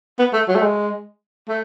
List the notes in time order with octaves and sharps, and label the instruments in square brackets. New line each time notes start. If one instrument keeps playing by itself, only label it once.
[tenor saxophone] B3
A3
F#3
A3
G#3
A3